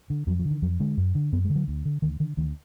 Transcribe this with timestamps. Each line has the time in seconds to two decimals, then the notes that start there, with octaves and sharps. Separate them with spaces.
0.10 D3
0.27 F2 F#3
0.39 F3
0.45 D3
0.51 D#3
0.62 F2 F#3
0.80 D3 G#3
0.97 F#2
1.15 D3
1.32 F#2 B3
1.44 G#3
1.50 D3
1.56 F#3
1.68 D2
1.85 D3
2.02 D2 D#3
2.20 D3 D#3
2.37 D2 D#3